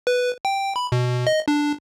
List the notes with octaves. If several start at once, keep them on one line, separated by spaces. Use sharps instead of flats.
B4
G5
B5
B2
D#5
D4